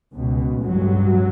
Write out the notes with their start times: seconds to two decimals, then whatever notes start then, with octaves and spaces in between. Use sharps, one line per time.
0.13 C#2 B2
0.63 A1 G2 F#3